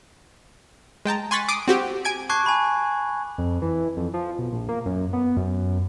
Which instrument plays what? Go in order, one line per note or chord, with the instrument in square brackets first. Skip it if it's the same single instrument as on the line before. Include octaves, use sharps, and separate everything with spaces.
[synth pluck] G#3 G5 A5 A#5
G#5 C6 C#6 F#6 A6 B6
D6 D#6 C7 D7
C4 F#4 G4
G#5 G#6 D7
[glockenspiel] A5 C#6 D6 F#6 G#6 C7
G#5 B5
[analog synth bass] F2
E3
F2
F3
B1
A#1
A#3
F#2
B3
F#2